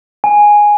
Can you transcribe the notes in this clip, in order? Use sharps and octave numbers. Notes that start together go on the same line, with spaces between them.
G#5